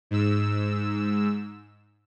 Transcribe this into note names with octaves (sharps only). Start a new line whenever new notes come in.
G#2 E6